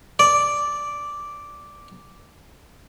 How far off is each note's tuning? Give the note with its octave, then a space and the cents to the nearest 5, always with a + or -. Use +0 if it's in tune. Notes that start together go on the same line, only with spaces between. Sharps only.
D5 -5